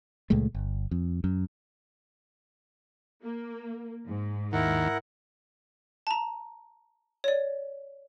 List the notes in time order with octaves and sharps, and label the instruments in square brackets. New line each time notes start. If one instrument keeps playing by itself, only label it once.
[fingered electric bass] C#2 A#2 G#3 A3
G1
F2
F#2
[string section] A#3
G#2
[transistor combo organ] D#2 [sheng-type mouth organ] E4 A#4 F#5
[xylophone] A5 A#5
C#5 D5